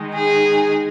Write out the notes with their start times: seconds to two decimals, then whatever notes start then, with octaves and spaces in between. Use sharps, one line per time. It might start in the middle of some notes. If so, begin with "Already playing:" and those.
Already playing: D#3 G#3 D#4
0.15 G#4